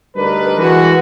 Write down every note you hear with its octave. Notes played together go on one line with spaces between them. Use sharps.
D2 G3 D4 D#4 A#4 B4
E3 G#3 F#4